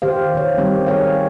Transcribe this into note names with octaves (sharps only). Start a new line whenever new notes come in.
D#3 G4 C5 F5
D#3 C#5
G3 C4 D#4 G4
G#4 C#5 F5